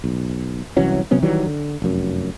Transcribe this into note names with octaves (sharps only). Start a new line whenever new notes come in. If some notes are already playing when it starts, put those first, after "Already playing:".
B1
C2 E3 F#3 C#4
C3 F#3 B3 C#4
D#3 E3 F#3 G3
D3
F1 F#2